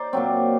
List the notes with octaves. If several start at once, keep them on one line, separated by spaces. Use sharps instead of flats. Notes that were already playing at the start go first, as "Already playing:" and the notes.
Already playing: D#4 C5 D5
A#2 F#3 C4